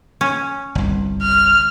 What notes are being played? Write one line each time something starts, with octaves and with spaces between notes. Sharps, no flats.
C#4
G1 C2
F6